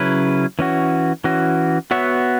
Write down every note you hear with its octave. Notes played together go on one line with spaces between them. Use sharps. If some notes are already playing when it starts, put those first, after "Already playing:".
Already playing: C#3 F#3 C#4 E4 B4
E3 C#4 F#4
E3 C#4 F#4
B3 F#4 C#5 E5